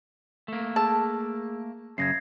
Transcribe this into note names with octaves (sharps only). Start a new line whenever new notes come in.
A3 A#3
G#4 A5 E6
F#2 C#3 G#6 A#6 C7